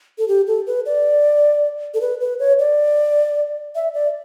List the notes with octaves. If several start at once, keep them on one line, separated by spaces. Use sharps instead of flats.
A4
G4
A4
B4
D5
A4
B4
B4
C#5
D5
E5
D5